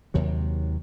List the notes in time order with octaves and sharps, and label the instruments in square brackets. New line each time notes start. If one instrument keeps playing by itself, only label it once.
[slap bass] D#2 C3 F#3